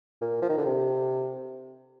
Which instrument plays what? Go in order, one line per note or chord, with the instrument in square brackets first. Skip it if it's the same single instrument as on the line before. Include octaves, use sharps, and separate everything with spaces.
[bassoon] A#2
F3
D#3
D3
C3